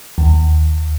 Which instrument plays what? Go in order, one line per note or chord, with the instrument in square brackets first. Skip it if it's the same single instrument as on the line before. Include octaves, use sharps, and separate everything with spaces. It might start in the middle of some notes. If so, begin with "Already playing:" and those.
[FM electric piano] D#2